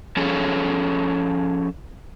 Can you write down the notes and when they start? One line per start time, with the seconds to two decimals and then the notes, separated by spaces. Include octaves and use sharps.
0.16 F3 C#4 G#4 A4 C#5